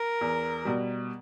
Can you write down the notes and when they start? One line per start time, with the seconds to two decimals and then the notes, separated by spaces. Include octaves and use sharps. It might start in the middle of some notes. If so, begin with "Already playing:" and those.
Already playing: A#4
0.21 E2
0.65 B2 G3